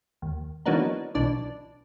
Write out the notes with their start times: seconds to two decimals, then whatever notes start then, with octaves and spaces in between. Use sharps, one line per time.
0.22 D#2
0.65 E3 F#3 A#3 B3 D4 D#4
1.15 B1 E3 D4 D6